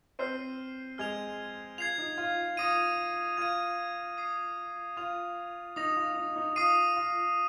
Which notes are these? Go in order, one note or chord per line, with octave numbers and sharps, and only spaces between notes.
C4 C5 F6 C7 D#7
G#3 G#4 F6 G#6 F7
F4 G#6 C7 F7
D#4
F4
F4 D#6 A#6 D#7
F4 G#6 D#7
D#6 C7 D#7
F4 G#6 F7
D#4 D#6 A#6 F7
F4
D#4
D#4
F4 D#6 C7 D#7
F4